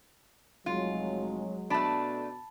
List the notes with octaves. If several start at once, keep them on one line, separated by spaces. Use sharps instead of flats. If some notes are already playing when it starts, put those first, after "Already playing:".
F1 F#3 G#3 F4
B2 A3 D4 A5 B5